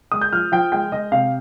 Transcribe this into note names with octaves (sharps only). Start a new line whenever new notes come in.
G#3 D#6
G6
F3 F6
F3 G5
G#3 G5
G#3 D#5
C3 F5